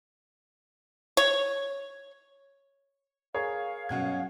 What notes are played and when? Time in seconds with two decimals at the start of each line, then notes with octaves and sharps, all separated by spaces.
1.17 C#5
3.34 G#4 A#4 C#5 F5
3.89 G2 B2 F#3 C#4 F#5 G#6